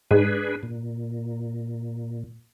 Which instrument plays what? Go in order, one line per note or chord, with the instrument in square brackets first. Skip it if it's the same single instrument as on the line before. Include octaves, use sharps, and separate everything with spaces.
[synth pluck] G#2 [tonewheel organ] D4 G#4 B4
[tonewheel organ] A#2